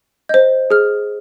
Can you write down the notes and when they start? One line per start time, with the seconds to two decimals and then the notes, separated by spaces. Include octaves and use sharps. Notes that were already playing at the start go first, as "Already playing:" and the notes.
0.29 C5 D#5 G6
0.71 G#4 F6